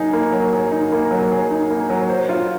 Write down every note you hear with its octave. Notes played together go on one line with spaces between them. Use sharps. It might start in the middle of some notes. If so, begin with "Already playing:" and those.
Already playing: F#3 A#3 D#4 G#4
A#3
F#3
G#4
D#4
A#3
F#3
G#4
D#4
A#3
F#3
C5
F4